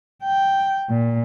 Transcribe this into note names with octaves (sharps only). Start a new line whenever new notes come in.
G5
A#2